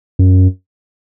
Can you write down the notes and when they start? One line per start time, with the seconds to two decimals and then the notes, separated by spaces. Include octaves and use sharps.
0.19 F#2